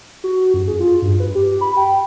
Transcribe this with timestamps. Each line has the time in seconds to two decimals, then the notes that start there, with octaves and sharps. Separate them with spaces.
0.24 F#4
0.54 F#2
0.68 G#4
0.80 F4
1.02 G2
1.20 B4
1.35 G4
1.61 B5
1.77 G5